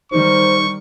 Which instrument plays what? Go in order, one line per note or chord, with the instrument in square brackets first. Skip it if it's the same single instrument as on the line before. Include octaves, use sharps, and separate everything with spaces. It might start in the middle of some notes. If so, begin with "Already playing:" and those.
[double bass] D#3 G3 [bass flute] D#4 [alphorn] C5 [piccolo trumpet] C#6